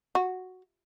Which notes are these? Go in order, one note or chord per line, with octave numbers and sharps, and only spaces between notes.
F#4